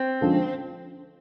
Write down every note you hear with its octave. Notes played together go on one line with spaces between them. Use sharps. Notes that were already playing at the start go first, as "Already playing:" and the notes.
Already playing: C4
D3 F3 G#3 C#4